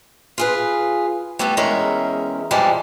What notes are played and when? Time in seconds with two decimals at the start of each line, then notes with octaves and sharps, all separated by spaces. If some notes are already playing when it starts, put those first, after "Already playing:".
0.38 F4 G#4 B4
1.39 G3 A3 B3 E4 A4
1.57 E2 G#3 C#4 A#4 E5
2.51 F2 E3 F3 G3 G#3 A5